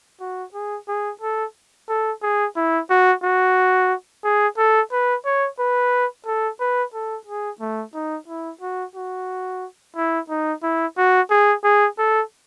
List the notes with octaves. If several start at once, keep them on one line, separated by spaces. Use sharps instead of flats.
F#4
G#4
G#4
A4
A4
G#4
E4
F#4
F#4
G#4
A4
B4
C#5
B4
A4
B4
A4
G#4
A3
D#4
E4
F#4
F#4
E4
D#4
E4
F#4
G#4
G#4
A4